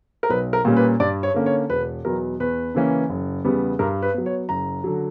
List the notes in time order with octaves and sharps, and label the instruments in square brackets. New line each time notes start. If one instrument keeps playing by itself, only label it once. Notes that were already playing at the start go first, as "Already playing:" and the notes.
[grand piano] A#4
B1 B4
A#4
A#2 G3 A#3 C#4
B4
G2 D5
C#5
D3 A#3 C#4
C#5
E1 B4
E2 B2 F#3 B3 A#4
E2 B4
C#3 E3 A#3 C#4
F#1
E2 C#3 G3 B3
G2 A#4
B4
F#3 B3
C#5
F#1 A#5
D3 F#3